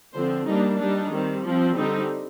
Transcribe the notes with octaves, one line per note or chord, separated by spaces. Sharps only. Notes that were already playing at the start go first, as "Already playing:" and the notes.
D3 F3 C4 C5
G3 A#3 D4 D#4
G3 D4 D#4
D#3 G3 C4
F3 C4
D3 G3 C4 D#4